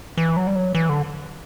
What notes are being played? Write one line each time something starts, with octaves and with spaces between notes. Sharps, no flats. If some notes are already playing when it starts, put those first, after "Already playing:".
E3
F#3
G3
F#3
E3
D3